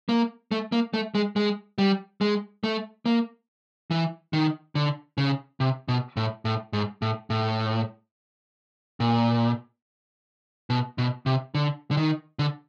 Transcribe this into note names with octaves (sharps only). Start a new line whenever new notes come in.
A#3
A3
A#3
A3
G#3
G#3
G3
G#3
A3
A#3
E3
D#3
D3
C#3
C3
B2
A2
A2
G#2
A2
A2
A#2
B2
B2
C3
D3
D3
D#3
D3